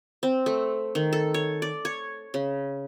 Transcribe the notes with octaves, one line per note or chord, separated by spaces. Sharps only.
C4
A3
D#3
A4
C#5
D5
C#5
C#3